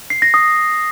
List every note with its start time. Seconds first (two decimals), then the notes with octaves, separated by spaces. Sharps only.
0.10 C7
0.22 A#6
0.34 D#6